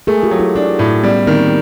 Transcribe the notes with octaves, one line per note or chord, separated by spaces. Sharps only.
A3 G#4 A#4
F4 G4
F#3
E4 F#4
D4 E4 F#4
A2
G3 B3 C#4
D#3 A#3 C4